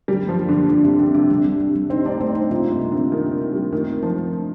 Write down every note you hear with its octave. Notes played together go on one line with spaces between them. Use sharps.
D3 G3
A#3
F3
D4
D3 G3
D3 D4
C3 G4
D3 D4
C3 D4
D3 G3
G3
G3
G3
C4 D#4
A3 D4
A3 C4
D#4
C3 F4
C3 A#3
G3
D3
F4
D#3 C4
C4
C4
G3 A3
D#3 A3
D#4
F3 D#4
A3
D4